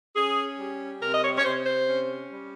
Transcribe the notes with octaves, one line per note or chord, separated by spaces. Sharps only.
C#4 G#4
G3
C3 A#4
D#5
C#5
C#5
C3 C5
C5
C#4
G3